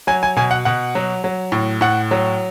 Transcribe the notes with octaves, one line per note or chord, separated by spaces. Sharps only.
F#3 G#5
G#5
B2 G#5
F#5
B2 F#5
F#3
F#3
A2
A2 F#5
F#3